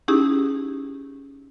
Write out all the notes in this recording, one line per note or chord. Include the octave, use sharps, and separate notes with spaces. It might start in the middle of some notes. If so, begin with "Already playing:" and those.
C#4 D#4 E4 G4 G#4